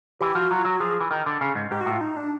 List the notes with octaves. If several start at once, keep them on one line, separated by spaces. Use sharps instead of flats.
E3 G4
F3 F#4
F#3 F4
F#3 F#4
F3 G#4
E3
D#3
D3
C#3
G#2
G#2 G4
F#4
A2 F4
D#4
D4